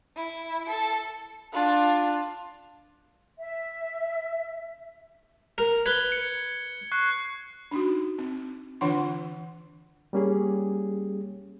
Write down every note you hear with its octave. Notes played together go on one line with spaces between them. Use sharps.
E4
A4
D4 F4
E5
A#4
B4 G#6 G7
C#7
C#6 F#6 C7
D4 D#4 F#4
C4
D3 E3 D4 F4 F#5 C6
G3 A#3 C#4 G4 G#4